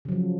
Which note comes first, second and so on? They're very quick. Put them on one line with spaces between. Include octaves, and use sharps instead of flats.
C#3 F#3 F3